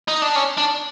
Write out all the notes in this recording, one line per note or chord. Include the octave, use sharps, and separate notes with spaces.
D#4
D4
C#4
D4